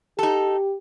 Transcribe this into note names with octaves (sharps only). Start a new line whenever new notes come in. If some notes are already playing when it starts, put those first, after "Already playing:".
D#4 G4 A4